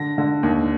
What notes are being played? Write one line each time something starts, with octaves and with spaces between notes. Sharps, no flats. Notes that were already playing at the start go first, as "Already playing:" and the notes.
Already playing: D3 A#6
D3
D#2